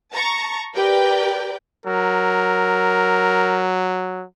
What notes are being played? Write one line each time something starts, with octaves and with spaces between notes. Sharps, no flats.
A5 A#5 C#6
G4 A#4 B4 D5 G5
F#3 A#4